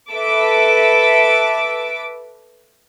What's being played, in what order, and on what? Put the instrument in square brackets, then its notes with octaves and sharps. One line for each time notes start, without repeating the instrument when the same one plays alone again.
[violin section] A4 B4 E5 D6